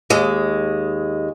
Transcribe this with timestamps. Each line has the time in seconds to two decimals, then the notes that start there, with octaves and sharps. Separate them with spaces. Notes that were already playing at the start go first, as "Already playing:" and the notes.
0.10 D#2 G#3